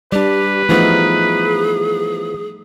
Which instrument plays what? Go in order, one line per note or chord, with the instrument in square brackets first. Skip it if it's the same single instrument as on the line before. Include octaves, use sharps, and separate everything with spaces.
[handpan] G3 [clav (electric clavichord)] D4 D5 [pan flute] G4 [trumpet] B4
[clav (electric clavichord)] E3 F3 B3 [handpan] A3 D#4 [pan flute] G#4